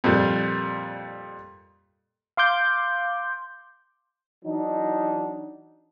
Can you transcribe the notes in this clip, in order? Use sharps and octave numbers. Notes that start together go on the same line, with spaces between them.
F2 A#2 G3
F5 C6 D6 G6
E3 F#3 D4 D#4